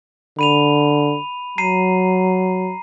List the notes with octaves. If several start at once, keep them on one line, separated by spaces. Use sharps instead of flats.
D3 B5 D#7 F7
F#3 A#5 C7 D#7